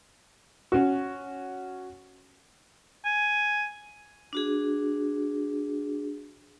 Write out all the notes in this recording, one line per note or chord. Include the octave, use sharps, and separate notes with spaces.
C#4 F#4
G#5
D4 F#4 G#4